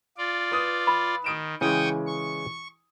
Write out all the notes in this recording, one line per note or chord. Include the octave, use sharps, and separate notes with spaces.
F4 D5
B4 D#6
B5
D#3 D#6 D7 E7
C#3 E3 G#3 G5 C#6 D#6
C#6